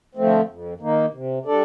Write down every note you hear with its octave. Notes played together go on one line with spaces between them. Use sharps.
D3 F3 A3 C4
F2
D#3 A#3 D#4
C3
G3 D4 A4 D5